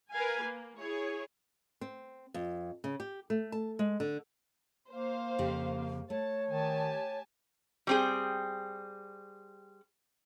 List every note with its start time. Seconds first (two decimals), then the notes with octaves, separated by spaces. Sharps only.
0.12 A#4 B4 F5 G#5
0.42 A#3
0.78 E4 G#4 C#5
1.81 C4
2.34 F2
2.84 C#3
3.00 G4
3.30 A3
3.52 A5
3.79 G#3
4.00 D3
4.90 A#3 C5 F5
5.38 F2 C#3 G4
6.10 A3 C#5 A5
6.50 D#3 G4 G#5 A5
7.87 G3 C4 G#4